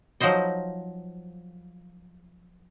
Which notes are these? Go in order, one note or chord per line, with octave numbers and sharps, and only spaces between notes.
F3 F#3 D#4 C5 D#5